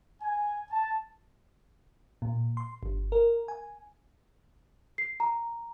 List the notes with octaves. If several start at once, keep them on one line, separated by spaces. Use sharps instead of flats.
G#5
A5
A#2
C6
G1
A#4
G#5
C7
A#5